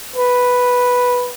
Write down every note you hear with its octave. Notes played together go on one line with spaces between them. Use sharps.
B4